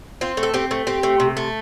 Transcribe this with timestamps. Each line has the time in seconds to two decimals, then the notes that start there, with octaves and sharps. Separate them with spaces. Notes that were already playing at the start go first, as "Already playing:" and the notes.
0.21 C4 F4
0.37 A3
0.43 A4
0.54 C4 G4
0.71 A3
0.87 C4 G4
1.03 A3
1.20 C3
1.37 A3